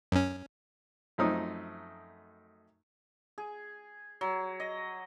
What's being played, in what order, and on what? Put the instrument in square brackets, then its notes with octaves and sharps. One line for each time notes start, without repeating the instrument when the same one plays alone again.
[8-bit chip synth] F#2 C#4
[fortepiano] F#2 F3 A3 C4 D#4 D#6
[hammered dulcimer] G#4
F#3
D#5